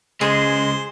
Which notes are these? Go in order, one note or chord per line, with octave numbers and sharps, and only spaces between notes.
C#2 C#3 G#3 G#4 C5